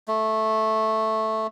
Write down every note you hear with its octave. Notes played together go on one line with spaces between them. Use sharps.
A3